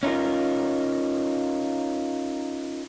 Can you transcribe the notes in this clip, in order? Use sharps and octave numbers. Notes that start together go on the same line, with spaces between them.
C#4 D#4 F4 A#4